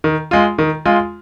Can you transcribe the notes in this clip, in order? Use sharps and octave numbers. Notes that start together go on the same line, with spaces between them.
D#3
G#3 F4
D#3
G#3 F4